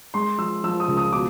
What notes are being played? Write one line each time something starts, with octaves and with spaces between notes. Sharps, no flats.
G#3 C6
F3 E6
F3 E6
D#6
C#2
D#6
B2 D6